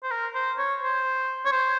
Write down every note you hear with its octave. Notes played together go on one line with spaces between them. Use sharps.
C5
A#4
C5
C#5
C5
C#5
C5